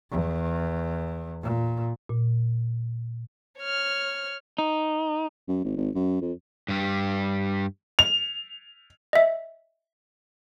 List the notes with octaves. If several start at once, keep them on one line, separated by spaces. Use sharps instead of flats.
E2
A#2
A#2
C#5 F6
D#4
F#2
G#1
G#1
F#2
F2
G2 G3
F7
D#5 E5